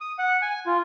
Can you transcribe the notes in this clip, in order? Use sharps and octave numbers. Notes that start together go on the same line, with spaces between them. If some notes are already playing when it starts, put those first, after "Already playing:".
D#6
F#5
G#5
F4